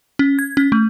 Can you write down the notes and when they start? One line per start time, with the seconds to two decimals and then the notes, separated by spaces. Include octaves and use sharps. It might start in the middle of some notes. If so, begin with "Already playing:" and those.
0.19 C#4
0.39 G#6
0.57 C#4
0.72 A3